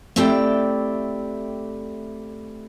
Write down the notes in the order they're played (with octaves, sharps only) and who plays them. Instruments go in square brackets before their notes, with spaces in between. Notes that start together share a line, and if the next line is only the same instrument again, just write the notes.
[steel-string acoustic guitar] A3 C4 E4 G4 D5 G5